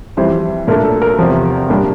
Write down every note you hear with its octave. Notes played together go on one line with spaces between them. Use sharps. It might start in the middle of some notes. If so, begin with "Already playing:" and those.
F2 E3 G3 C4 C5
A#2 A3 D4 A#4
A4
A#4
E2 C3 F3
A#2 G3 A#3 D4